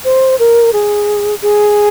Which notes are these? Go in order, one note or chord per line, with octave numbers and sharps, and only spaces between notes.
C5
A#4
G#4
G#4